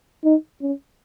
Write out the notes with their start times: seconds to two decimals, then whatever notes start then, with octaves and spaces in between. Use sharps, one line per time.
0.24 D#4
0.61 C#4